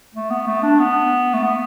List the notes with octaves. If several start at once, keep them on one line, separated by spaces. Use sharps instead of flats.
A3
B3
A3
D4
B3
A3
B3